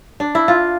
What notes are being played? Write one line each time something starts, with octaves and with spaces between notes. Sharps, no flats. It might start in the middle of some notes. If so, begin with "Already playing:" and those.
D4
E4
F4